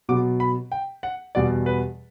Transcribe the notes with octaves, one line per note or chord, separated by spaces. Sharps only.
B2 F#3 B3 D6
B5
G5
F#5
E2 B2 G3 D5
B4